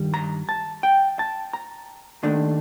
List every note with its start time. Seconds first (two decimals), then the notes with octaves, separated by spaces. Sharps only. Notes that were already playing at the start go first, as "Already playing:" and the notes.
Already playing: G2 D#3 G3
0.14 A#5
0.49 A5
0.83 G5
1.19 A5
1.53 A#5
2.23 D#2 D#3 A3 D4